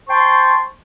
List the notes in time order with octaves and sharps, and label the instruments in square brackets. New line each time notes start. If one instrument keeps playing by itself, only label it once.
[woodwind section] C5 G5 A5 C6 C#6